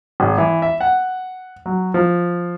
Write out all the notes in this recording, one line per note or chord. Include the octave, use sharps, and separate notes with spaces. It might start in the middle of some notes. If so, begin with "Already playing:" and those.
G#1
E3
E5
F#5
F#3
F3